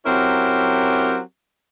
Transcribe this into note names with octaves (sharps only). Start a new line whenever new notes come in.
F#3 C4 C#4 E4 G4 A#4